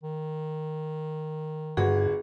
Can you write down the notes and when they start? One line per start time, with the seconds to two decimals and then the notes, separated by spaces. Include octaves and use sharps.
0.04 D#3
1.77 G1 G2 F#4 G#4